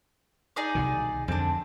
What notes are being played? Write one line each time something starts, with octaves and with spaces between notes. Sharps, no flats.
D#4 G#4 D5
C2 B2 D#3
F2 D3 C4 D4